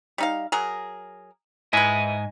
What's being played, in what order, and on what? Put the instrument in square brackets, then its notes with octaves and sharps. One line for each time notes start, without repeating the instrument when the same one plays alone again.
[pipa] G3 D#4 F5
F#3 G#4 A#4
[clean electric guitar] G#2 D#5 G#5 [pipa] E4 B4